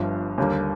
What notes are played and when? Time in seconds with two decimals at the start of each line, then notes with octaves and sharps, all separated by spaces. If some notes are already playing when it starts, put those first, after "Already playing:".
Already playing: G1 G2 F3
0.38 D#2 D3 G3 A#3